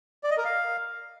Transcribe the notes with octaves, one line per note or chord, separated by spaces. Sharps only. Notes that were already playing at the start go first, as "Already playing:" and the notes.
D5
D#5
A#4
F5